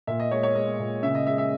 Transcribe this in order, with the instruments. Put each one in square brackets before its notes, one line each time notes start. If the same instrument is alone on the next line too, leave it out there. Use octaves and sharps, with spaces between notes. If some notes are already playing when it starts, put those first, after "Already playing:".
[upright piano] A#2 E5
D#5
G#3 C#5
C#5
G#3 D#5
A#2
C#3 E5
D#5
G#3 E5
E5